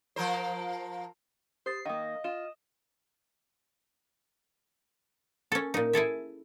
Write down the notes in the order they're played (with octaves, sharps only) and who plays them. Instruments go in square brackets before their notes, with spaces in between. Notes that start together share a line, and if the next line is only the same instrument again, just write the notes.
[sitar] F3 A#4 C5
[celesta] G4 D#6 A6 [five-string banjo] C5 [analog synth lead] C7
[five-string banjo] D#3 A#3 [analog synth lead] D#5 [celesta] F5 D#6
[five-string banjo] F4 [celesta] E7
[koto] C#4 A4
A#2 D#4
E4 G#4 A4 E5